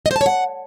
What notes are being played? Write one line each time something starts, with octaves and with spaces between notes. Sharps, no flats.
D#5
C5
A5
C#5
F#5